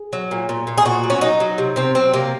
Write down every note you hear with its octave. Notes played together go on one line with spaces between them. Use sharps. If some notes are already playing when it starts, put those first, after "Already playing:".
Already playing: G#4
F#3
A#2
A#2
A#2
G#4
A#2 F#4
F#3
C#4
F#3 D#4
F#3
C3
C3 C4
F#3 C4
C3 A#3